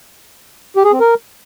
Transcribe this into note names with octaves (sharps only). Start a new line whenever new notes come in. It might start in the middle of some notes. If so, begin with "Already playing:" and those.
G4
G#4
C4
A#4